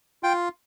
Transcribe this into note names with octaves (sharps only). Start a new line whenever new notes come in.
F4 G5